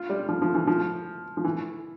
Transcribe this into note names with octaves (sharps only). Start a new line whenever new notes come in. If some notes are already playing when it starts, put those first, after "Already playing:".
Already playing: F4
G3
F3
F3
E3
F3
F3
E3